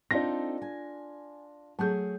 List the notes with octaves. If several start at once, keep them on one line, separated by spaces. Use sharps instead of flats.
C4 D4 D#4 F4 A4 A#6
G#5
F#3 A3 G#4 A5 G6